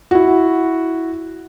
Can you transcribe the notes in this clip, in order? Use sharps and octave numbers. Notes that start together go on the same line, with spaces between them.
E4 F#4